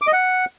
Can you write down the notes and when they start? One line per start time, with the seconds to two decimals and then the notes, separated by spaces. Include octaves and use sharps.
0.02 D6
0.07 D#5
0.13 F#5